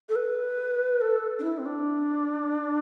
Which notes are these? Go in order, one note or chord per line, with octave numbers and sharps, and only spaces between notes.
A4
B4
A4
D4
E4
C4
D4